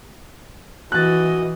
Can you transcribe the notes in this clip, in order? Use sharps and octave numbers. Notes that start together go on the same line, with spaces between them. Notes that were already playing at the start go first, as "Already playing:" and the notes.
E3 F#4 D#5 F#6 A6